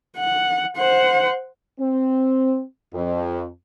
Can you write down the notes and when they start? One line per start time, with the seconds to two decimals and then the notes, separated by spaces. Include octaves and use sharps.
0.17 F#5
0.77 C5 F#5
1.80 C4
2.94 F2